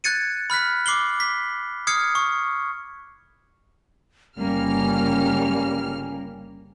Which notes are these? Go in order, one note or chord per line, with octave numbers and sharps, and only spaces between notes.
F#6 G#6 A6 C#7 D#7
B5 F6 F#6 B6
D6 C7 F#7 G7
B6
D#6 F6 G#6 C7 C#7
C#6
G1 C#3 G3 A#3 C#4 F6